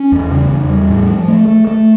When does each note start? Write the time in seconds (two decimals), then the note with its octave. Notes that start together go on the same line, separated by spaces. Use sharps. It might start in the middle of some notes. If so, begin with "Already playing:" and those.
Already playing: C#4
0.12 E2
0.31 C#3
0.51 E2
0.69 G3
0.90 A2
1.09 F3
1.28 A3
1.48 A3
1.67 A3